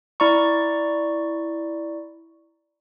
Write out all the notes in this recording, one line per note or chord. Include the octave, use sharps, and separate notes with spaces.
E4 D5 A#5 C#6